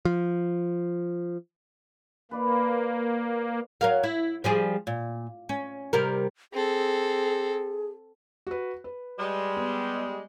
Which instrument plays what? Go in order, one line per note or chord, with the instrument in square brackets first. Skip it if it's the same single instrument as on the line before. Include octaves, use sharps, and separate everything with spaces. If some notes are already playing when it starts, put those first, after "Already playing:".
[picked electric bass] F3
[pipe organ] A#3 [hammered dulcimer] B4 D5 F5
[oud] F#3 A#4 F5
E4
F3 G3 G#4
A#2
C#4
C3 G3 A#4
[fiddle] C4 A4 [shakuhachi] G#4
[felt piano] F#4 B4
B4
[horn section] G3 G#3
[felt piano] B3